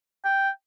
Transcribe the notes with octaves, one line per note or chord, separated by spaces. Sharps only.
G5